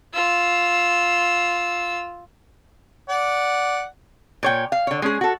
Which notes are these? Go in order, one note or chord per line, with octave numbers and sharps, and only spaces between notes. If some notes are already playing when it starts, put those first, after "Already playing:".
F4 E6
D5 F#5
A#2 C#5 G5
F5
D3 C#5
G#3 C#4 G#4
F#4 A4